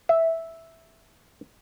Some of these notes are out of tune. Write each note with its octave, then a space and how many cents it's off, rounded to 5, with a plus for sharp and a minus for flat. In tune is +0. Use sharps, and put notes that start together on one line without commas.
E5 -5